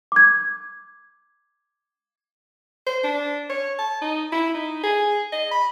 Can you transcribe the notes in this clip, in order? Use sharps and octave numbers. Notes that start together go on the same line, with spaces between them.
D6 G#6
C5
D4
C#5
A5
D#4
E4
D#4
G#4
D#5
B5